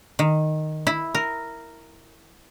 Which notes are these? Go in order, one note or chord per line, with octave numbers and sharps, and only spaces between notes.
D#3
E4
A#4